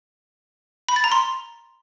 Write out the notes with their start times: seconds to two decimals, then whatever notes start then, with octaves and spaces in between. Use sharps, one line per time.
0.89 B5
0.96 A6
1.04 A#5
1.12 C6